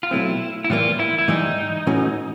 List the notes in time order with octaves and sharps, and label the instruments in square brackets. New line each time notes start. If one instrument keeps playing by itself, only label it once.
[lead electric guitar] F4
[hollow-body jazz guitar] B2 F#3 A3 C4 [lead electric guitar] E4
[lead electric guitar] E4
[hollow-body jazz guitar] A2 E3 G3 A#3 [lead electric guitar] F4
[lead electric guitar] E4
E4
[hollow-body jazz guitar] G#2 E3 G3 [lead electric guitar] D#4
[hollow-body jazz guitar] A2 E3 A3 C#4 F#4